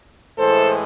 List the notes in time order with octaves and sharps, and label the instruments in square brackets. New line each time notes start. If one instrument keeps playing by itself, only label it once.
[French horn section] A2 E3 G#3 A4 C5